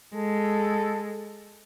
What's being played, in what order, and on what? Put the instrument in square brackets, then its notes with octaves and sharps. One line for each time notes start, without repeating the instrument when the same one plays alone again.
[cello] G#3 [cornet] A4